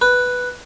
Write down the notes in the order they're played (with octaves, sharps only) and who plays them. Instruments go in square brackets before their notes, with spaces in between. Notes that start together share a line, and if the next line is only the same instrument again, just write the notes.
[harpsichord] B4